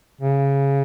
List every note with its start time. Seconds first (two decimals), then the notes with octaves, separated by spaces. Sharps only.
0.21 C#3